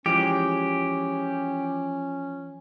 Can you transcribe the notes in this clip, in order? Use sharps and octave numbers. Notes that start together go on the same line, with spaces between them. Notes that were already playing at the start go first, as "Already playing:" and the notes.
E3 F3 G#3 C#4 G4